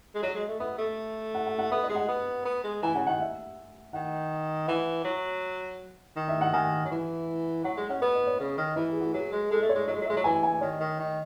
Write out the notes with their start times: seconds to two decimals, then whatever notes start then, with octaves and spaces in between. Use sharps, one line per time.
0.15 G#3
0.23 F#3 D#5
0.35 G#3
0.48 A3
0.60 B3 E5
0.78 A3
1.34 F#5
1.47 F#5
1.59 F#5
1.71 B3 E5
1.83 D#5
1.89 G#3
1.95 F#5
2.08 B3
2.45 B3
2.64 G#3
2.82 E3 G#5
2.95 C#3 F#5
3.07 D#3 F#5
3.20 E5
3.93 D#3 F#5
4.67 E3 F#5
5.04 F#3
6.16 D#3
6.28 E5
6.41 F#5
6.53 D#3 G#5
6.85 F#3
6.91 E3
7.64 F#3 F#5
7.77 G#3 D#5
7.89 C#4 F#5
8.02 B3 D#5
8.15 D#5
8.27 C#5
8.39 C#3
8.57 D#3
8.76 E3 B4
8.89 G#4
9.00 F#4
9.13 F#3 G#4
9.32 G#3
9.51 G#3 A4
9.62 A3
9.69 C#5
9.75 G#3
9.88 F#3 D#5
9.94 G#3
10.02 F#3
10.05 E5
10.10 G#3
10.16 F#3
10.24 E3 G#5
10.43 G#5
10.61 D#3 C#5
10.80 D#3
10.99 D#3